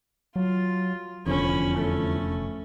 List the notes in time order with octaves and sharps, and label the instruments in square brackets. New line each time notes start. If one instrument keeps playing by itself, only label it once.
[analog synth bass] F#3 [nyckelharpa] F4
[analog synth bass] F1 [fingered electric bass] E2 D3 F3 [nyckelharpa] C#4 B5
[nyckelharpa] A3 C#4